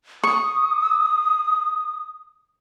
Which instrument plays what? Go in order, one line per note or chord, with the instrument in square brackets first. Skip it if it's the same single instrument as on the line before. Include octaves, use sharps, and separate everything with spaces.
[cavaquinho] C#6 [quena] D#6